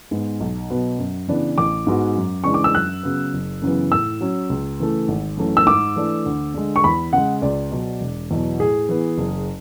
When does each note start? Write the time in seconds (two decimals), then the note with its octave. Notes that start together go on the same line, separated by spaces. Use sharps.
0.11 G#2 G#3 B3
0.40 B1
0.70 B2 F#3 B3
0.99 F#2
1.28 C#3 E3 B3 D4
1.58 A1 D6
1.87 G#2 G#3 B3 F#4
2.16 F#2
2.44 C#3 E3 G#3 D4 C#6
2.54 D6
2.64 E6
2.74 F#2 F#6
3.03 C#3 F#3 B3
3.34 F#1
3.62 F#2 C#3 E3 B3
3.92 A2 E6
4.21 F#3 C#4
4.50 C#2
4.80 C#3 E3 A3
5.08 G#1
5.37 F#2 E3 A3 C#4
5.57 E6
5.66 G#2 D6
5.96 E3 A3 D4
6.26 D2
6.54 D3 G#3
6.76 C#6
6.84 E2 B5
7.13 C#3 G#3 F#5
7.42 C#2 D5
7.71 B2 F#3
8.01 E1
8.31 E2 B2 F#3
8.59 A2 G#4
8.89 E3 B3
9.18 F#1